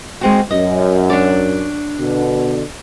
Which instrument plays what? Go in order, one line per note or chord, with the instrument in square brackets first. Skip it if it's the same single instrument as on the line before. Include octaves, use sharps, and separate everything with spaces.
[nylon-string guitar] G#3 C4 F#4
[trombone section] F#2 [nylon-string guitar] D#5
[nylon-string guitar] D4 C#5 D5
[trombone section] B2 D3